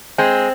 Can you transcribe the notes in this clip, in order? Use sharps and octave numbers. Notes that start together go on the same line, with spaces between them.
G#3 C4